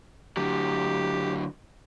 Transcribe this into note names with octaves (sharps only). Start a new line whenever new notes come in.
D3 F#3 G4